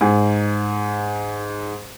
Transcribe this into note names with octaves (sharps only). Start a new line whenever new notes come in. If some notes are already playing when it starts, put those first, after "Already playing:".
G#2 G#4